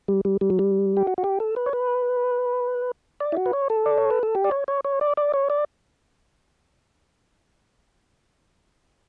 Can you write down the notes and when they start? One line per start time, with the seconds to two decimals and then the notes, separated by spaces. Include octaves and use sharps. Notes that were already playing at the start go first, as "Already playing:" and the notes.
0.08 G3
0.25 G3
0.41 G3
0.50 F#3
0.59 G3
0.97 G4
1.07 F#4
1.18 F#4
1.24 G4
1.40 A4
1.56 B4
1.66 C#5
1.73 B4
3.20 D5
3.32 E4
3.37 F#4
3.46 B4
3.53 C#5
3.70 A4
3.86 D5
3.97 C#5
4.11 B4
4.23 A4
4.35 G4
4.44 D5
4.51 C#5
4.68 C#5
4.84 C#5
5.01 D5
5.17 D5
5.34 C#5
5.50 D5